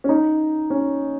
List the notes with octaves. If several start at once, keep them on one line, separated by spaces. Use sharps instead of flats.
C#4
D#4
C#4